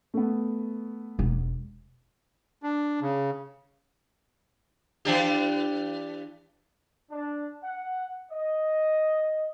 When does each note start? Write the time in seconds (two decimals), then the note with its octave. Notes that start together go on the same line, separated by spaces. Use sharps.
0.14 A3 B3
1.19 E1
2.63 D4
3.02 C#3
5.05 E3 D4 G4
7.10 D4
7.63 F#5
8.31 D#5